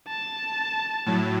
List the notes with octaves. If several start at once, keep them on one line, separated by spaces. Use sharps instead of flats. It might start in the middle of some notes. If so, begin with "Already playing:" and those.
A5
A2 F#3